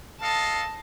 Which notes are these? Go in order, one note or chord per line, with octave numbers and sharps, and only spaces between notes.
A4 D#5 F5 A5